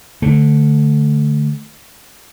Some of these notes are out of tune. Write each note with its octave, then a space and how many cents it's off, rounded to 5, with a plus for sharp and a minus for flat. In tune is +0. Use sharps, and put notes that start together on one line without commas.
D3 +0 A3 +0